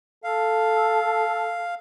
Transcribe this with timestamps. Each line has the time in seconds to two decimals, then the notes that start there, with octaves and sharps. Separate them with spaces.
0.24 A4 F5